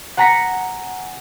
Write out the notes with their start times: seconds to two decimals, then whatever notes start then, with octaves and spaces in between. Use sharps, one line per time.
0.17 F#5 G#5 A#5 A#6 B6 C#7